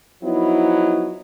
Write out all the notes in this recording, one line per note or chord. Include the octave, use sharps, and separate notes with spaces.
F3 F#3 B3 D#4 E4